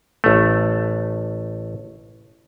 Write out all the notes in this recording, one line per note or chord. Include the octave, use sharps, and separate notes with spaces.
A1 A3